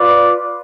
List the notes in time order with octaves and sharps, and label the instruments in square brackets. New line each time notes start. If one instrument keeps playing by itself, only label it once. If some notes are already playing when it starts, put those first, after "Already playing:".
Already playing: [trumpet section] F4 B4 D5